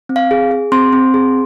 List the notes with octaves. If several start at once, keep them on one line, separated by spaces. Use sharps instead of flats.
C4
F5
G#4
G#4
C4 C6
C4
G#4